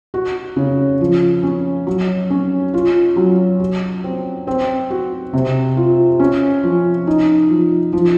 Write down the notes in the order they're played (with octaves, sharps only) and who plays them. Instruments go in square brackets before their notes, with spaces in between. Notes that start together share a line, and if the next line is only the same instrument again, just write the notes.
[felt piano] F#4
C#3
F3
C#4
F#3
C#4
F4
F#3
F#4
C4
C4
F#4
C3
F4
C#4
F3
D#4
F3
F3